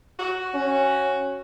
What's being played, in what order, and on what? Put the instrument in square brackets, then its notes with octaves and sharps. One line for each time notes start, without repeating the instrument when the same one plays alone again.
[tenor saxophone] F#4
[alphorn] C#4